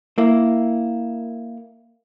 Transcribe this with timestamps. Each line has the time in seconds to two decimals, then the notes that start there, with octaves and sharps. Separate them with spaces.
0.18 A#3 E4